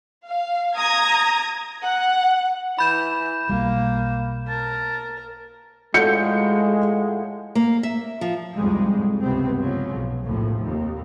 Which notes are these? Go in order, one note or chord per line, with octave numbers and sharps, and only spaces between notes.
F5
A#5 D#6 G#6 A#6
F#5
E3 B5 G6 E7
B1 G3 A#3
A#4 A5
A2 F3 G#3 F#5 G6 C#7
A#3
E5
F3
C2 F2 G#2 G3 G#3
C#2 G2 C3 B3 C4
G#2 C#3 F3 F#3
B1
D#2 A2 C3 F3
F1 D#2